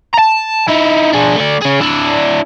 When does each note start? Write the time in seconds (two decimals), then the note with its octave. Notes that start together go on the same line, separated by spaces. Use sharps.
0.14 A5 A#5
0.68 D#4 E4
1.13 D4 G#4
1.36 A3 D5
1.62 C#4 G#4
1.81 D4 E4